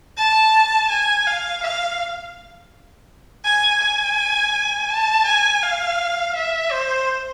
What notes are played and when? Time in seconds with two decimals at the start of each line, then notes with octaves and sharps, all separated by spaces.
0.17 A5
0.90 G#5
1.27 F5
1.63 F5
3.44 G#5
3.81 G#5
4.89 A5
5.26 G#5
5.62 F5
6.35 E5
6.71 C5